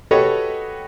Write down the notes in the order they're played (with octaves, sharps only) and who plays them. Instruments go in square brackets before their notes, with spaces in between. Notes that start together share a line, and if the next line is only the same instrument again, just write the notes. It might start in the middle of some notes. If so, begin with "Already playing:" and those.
[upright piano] F#4 G4 A4 B4 C#5 D#5